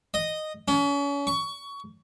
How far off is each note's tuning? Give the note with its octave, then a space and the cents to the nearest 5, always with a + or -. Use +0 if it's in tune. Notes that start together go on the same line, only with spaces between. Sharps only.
D#5 -5
C#4 +35
C#6 +20